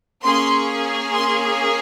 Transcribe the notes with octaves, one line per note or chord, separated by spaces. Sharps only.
A#3 C#4 G#4 C6
C6